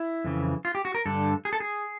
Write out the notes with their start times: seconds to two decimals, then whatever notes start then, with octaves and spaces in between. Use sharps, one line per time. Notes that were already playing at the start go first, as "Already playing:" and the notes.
Already playing: E4
0.24 F2 C#3 E3
0.65 F4
0.75 G4
0.85 F#4
0.95 A#4
1.06 G2 D3 A4
1.45 G#4
1.53 A4
1.60 G#4